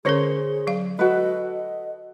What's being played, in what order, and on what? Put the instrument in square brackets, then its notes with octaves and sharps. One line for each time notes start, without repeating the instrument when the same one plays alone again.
[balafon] D3 C#4 A#4 [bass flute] G#4 [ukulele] C5 C#5
[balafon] F#3 F5
[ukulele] F#4 A4 B4 [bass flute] D#5
[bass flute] D#5